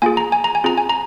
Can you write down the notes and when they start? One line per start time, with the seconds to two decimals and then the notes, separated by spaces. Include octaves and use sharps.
0.02 A#3 F4 G#4 G#5
0.17 A#5
0.32 G#5
0.44 A#5
0.55 G#5
0.64 C4 F4 G#4 A#5
0.78 G#5
0.89 A#5